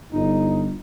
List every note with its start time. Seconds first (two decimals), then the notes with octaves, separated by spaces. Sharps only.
0.12 G1 D#4